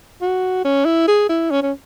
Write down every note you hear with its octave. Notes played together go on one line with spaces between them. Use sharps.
F#4
C#4
E4
G#4
E4
C#4
C#4